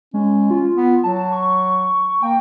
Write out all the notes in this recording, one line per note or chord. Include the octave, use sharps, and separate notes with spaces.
G#3 C#4
F4
B3
F#3 A5
C#6
A#3 G5